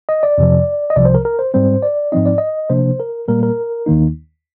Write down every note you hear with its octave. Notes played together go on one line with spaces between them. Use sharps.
D#5
D5
F2 C3 F3
D#5
C2 C3 F3 D5
C5
A#4
A#4
C5
G#2 G3 C4 C5
D5
G#2 F3 C4 D#4 D#5
D5
D#5
C3 F3 A#3 D4 C5
A#4
A#2 G3 A#3 A#4
A#4
D#2 D#3 A#3 D#4